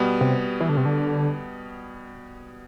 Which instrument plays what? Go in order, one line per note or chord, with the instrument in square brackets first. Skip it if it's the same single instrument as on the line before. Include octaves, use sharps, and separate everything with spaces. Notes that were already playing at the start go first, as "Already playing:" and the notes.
Already playing: [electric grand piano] B2 G3 B3
[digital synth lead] C3
E3
D3
C3
D3